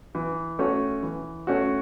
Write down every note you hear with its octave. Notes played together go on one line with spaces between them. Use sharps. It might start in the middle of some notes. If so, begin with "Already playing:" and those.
E3
A3 C#4 F#4
E3
A3 C#4 F#4